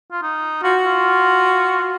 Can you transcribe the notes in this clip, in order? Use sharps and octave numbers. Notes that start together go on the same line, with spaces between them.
F4
D#4
F4 F#4
F4